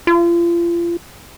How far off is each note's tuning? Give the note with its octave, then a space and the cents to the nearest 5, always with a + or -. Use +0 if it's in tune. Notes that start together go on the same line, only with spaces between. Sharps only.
F4 -35